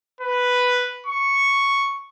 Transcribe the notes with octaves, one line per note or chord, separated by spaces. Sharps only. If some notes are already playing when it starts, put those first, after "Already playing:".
B4
C#6